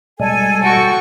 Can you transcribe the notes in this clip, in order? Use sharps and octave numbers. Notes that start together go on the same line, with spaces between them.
B2 G3 G#3 A4 G#5
F#4 A4 G5 C#6